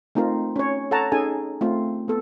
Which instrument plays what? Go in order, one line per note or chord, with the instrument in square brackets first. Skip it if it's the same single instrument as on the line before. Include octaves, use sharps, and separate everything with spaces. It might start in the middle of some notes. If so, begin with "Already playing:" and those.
[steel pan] A3 C4 D#4 F4 A#4
C#4 C#5
A4 C#5 F#5 A5 A#5
C#4 D#4 G#4 A4 G#5
A3 C4 F4
B3 A4